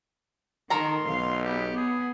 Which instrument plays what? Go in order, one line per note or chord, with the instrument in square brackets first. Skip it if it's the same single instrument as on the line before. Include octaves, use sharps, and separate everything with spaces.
[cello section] D#3 [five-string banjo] A4 A#4 A#5 [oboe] C6
[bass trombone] B1 [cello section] F5
[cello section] B3 [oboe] G4
[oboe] G#4